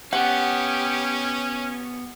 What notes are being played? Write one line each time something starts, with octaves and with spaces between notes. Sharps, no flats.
B3 C#4 G4 F#5